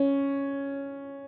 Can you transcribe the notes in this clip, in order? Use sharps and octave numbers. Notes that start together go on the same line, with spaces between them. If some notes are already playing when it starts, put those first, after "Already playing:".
Already playing: C#4